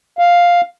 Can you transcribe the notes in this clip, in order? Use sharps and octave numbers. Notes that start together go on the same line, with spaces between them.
F5